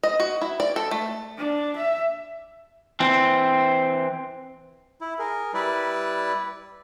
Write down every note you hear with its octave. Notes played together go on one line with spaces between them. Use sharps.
D#5
F#4
E4
D5
A4
A3
D4
E5
E3 C4
E4
G#4 A#4
G3 E4 B4 D5